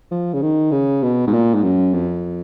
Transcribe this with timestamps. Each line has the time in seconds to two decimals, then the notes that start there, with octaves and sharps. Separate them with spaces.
0.11 F3
0.33 C#3
0.42 D#3
0.71 C#3
1.03 B2
1.27 G#2
1.33 A#2
1.54 G#2
1.63 F#2
1.93 F2